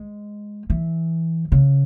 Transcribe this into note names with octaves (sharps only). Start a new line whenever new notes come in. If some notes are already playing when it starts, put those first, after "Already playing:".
Already playing: G#3
E3
C#3